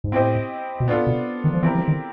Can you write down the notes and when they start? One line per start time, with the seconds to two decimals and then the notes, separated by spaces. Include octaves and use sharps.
0.04 G#2
0.12 A2 C4 E4 G4 C5 D#5
0.80 B2
0.87 A#2 B3 D4 F4 A4
1.07 B2
1.44 D#3
1.53 F3
1.62 E3 C4 E4 G4 A#4
1.75 F3
1.88 D#3